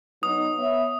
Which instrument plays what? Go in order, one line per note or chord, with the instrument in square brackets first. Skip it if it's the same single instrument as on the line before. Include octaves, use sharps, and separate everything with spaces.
[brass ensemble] F#3 B3 D#4 [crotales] D#6
[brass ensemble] B3 C#5 E5